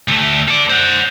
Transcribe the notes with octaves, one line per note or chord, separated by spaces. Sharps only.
D2 A3
A4 D5
C5 F#5